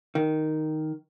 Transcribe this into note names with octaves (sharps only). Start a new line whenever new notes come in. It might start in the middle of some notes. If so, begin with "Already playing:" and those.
D#3